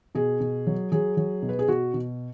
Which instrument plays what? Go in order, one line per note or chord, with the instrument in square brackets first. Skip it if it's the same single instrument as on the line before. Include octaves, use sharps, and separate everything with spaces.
[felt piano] B2 G#4
B2
F#3
F#3 G#4
F#3
B2
B4
G#4
B2 F#4
B2